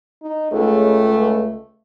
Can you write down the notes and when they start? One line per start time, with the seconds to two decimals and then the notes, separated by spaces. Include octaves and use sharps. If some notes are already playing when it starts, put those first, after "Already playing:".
0.22 D#4
0.52 C#2 A3